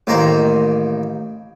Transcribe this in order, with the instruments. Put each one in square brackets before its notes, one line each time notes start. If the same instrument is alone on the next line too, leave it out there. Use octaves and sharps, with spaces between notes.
[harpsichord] A1 D#3 A#3 C5 A#5